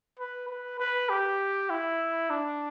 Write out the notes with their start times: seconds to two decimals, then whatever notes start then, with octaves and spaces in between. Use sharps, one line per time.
0.19 B4
0.49 B4
0.79 B4
1.09 G4
1.70 E4
2.30 D4